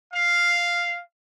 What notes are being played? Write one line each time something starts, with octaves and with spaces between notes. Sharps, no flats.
F5